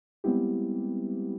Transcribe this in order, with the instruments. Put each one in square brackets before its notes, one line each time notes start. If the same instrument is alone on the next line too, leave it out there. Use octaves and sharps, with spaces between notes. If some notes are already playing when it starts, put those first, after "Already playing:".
[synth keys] G3 G#3 B3 C4 E4 G4